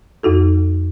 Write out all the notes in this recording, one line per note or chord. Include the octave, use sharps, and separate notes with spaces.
F2 D#4 F#4 A4